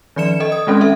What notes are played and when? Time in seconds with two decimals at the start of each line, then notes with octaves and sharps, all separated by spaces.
0.16 D#3 F3 D5 C#7 E7
0.40 A4 D#5
0.52 D#6
0.67 D#3 G#3 C4 C#4 A4
0.81 A4 E5